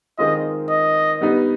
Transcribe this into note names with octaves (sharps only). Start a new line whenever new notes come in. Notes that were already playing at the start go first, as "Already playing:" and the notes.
D#3 G#3 C4 F4 D#5
D#5
G3 B3 D#4